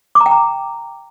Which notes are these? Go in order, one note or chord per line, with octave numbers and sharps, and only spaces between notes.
D6
A#5
G5
A#5